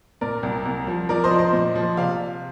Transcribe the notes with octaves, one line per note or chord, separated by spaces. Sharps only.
A#2 A#4 D5
C2
C2
F3
F3 A#4 D5
C5 D#5
F3
C5 D#5
A#2
F3
C3 D5 F5